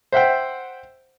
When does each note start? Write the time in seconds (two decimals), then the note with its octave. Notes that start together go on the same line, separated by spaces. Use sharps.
0.12 C5 E5 F#5 G5